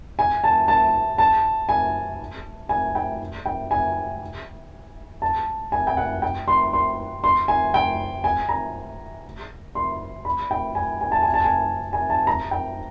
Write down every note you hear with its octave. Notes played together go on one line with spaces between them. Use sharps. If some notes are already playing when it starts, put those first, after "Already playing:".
G#5
A5
A5
A5
G#5
G#5
G5
G5
G#5
A5
G#5
G5
F#5
G5
C6
C6
C6
G#5
G5
G#5
A#5
C6
B5
G5
G#5
G#5
A5
G#5
A5
G#5
G#5
A5
A#5
G5